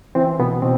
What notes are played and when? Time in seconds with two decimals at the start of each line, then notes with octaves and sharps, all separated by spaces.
0.15 E3 C4
0.39 B2 B3
0.62 B2 C4